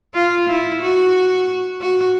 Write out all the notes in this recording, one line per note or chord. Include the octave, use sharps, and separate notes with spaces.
F4
E4
F#4
F#4